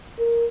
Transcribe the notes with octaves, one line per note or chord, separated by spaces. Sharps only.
A#4